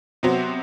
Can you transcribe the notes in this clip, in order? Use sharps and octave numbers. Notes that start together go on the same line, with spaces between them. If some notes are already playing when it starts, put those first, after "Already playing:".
C3 F#3 B3 F#4 C5